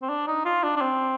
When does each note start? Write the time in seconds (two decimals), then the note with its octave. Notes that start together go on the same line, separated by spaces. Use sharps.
0.02 C4
0.09 D4
0.27 D#4
0.45 F4
0.63 D4
0.76 D4
0.81 C4